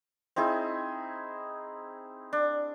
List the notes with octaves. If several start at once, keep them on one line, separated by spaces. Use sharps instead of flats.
C4 D#4 E4 G#4
D4